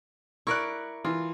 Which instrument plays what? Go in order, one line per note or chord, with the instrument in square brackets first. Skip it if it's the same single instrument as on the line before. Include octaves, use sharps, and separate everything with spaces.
[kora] E4 A#4 D5 [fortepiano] C#6 F#6
[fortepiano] E3 [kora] F4